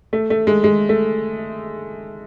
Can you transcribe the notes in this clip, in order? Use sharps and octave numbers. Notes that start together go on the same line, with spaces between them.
A3
A3
G#3
G#3
A3